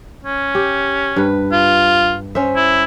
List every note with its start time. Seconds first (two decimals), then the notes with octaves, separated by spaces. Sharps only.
0.25 C#4
0.55 G4
1.16 G2 B4
1.52 F4
2.35 C#4 C5 E5
2.56 E4